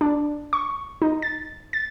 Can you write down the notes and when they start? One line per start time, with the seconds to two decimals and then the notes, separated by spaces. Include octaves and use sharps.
0.01 D4
0.53 C#6
1.02 D#4
1.22 A6
1.73 A6